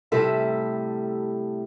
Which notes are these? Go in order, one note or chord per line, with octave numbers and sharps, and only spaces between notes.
A2 C3 G3 A4 E5